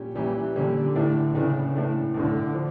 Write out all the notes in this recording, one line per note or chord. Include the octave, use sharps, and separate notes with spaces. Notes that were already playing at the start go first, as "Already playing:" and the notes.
Already playing: A#2 G3 C#4 G4
A#2 E3 G3 C#4 G4
A#2 D3 G3 C#4 G4
A2 E3 A3 D4
A2 C#3 E3 A3 D4
A2 E3 A3 D4
A2 D3 E3 A3 D4
F3